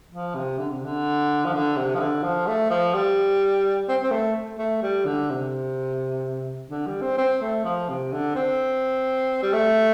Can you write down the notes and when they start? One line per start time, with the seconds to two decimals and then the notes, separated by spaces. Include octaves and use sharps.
0.12 F3
0.35 C3
0.58 D3
0.71 C3
0.84 D3
1.45 F3
1.53 D3
1.76 C3
1.95 F3
2.00 D3
2.23 F3
2.47 A3
2.70 F3
2.94 G3
3.89 C4
4.03 C4
4.11 A3
4.58 A3
4.82 G3
5.05 D3
5.30 C3
6.70 D3
6.87 G3
7.01 C4
7.18 C4
7.41 A3
7.64 F3
7.89 C3
8.12 D3
8.35 C4
9.42 G3
9.53 A3